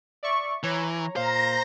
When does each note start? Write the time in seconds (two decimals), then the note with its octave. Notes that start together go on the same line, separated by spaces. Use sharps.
0.23 D5 E5 C#6
0.63 E3 C#5 A#5
1.16 A#2 C5 F5 A#5 A#6